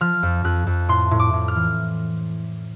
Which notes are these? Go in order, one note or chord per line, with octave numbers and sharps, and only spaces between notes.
F3 F6
F2
F2 F#6
F2
A2 C6
A2
D6
A2
F6
E3